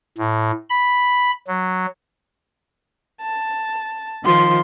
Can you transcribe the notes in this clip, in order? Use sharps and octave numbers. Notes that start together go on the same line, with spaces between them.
A2
B5
F#3
A5
D#3 F3 C6